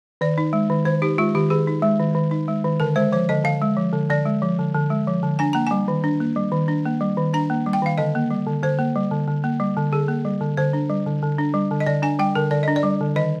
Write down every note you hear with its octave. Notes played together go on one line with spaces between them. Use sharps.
D#3 D5
D#4
G#3
D#3
D#3 C5
D#4 G4
G#3 F4
D#3 G4
D#3 G#4
D#4
G#3
D#3
D#3
D#4
G#3
D#3
D3 A#4
G#3 C5
F3 C5
D3 D#5
D3 F5
G#3
F3
D3
D3 D5
G#3
F3
D3
D3
G#3
F3
D3
D4 G#5
A#3 A#5
G3 G#5
D#3
D4
A#3
G3
D#3
D4
A#3
G3
D#3
D4 A#5
A#3
G3
G5
D#3 F5
D3 D#5
A#3
G3
D3
D3 C5
A#3
G3
D3
D3
A#3
G3
D3
D3 G#4
A#3
G3
D3
D3 C5
D4
G3
D3
D3
D4
G3
D3
D#5
D3 D5
D4 G#5
G3 G5
D3 A#4
D3 D5
D4 D#5
D5
G3
D3
D#3 D#5